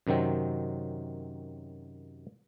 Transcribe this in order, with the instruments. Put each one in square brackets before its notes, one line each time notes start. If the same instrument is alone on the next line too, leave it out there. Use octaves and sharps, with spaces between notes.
[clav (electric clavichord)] F#2 C3 D#3 F#3 C4